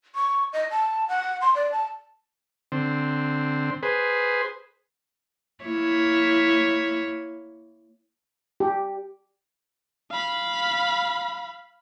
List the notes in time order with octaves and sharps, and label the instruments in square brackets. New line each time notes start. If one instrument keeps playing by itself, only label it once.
[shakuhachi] C#6
D#5
A5
F#5
C6
D5
A5
[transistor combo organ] D3 C4
G#4 B4 C5
[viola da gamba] A#3 E4 C#5
[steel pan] G4
[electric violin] F5 B5